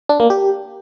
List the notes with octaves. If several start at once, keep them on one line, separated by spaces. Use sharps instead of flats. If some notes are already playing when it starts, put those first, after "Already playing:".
D4
A#3
G4